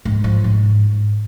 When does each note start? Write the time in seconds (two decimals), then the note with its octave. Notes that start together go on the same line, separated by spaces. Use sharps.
0.05 G#2
0.24 F3
0.44 G#2